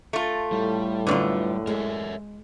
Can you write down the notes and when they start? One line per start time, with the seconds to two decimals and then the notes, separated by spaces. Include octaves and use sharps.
0.13 A3 F4
0.52 A2 G3
1.07 F#2 D3 B3 D4 F4
1.67 G#3 A#4 C#5 E5